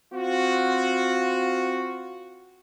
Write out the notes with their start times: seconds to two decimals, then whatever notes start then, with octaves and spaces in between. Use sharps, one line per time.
0.14 C4 F4 F#4